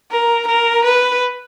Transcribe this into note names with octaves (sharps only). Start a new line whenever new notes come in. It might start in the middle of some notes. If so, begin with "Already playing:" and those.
A#4
A#4
B4